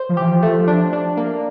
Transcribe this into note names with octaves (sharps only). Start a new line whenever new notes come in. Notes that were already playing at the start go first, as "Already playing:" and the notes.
Already playing: C5
F3
E3 G4
F3
A3
D4
D4
A#3